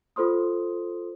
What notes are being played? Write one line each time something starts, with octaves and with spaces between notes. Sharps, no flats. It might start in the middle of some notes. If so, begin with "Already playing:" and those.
F4 A4 C5 C6 D#6